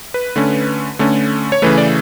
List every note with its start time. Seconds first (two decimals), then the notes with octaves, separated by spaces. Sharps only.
0.14 B4
0.36 D3 A3 C#4
0.99 D3 A3 C#4
1.52 C#5
1.62 C#3 E3 A3 B4
1.78 D5